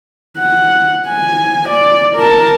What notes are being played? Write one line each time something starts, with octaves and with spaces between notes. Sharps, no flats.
F#5
G#5
D5
A#4 A5